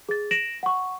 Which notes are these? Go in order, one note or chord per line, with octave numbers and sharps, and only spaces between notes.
G#4 A6
A#6 D7 E7 F#7
F#5 C#6